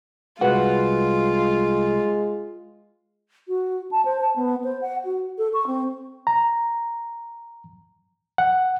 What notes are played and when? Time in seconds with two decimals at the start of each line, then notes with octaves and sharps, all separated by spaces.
0.41 C2 G#3 F4 F#4 B4 F#5
3.48 F#4
3.91 A5
4.05 C5
4.21 A5
4.36 B3
4.64 C5
4.81 F#5
5.05 F#4
5.38 A4
5.54 C#6
5.67 C4
6.27 A#5
8.38 F#5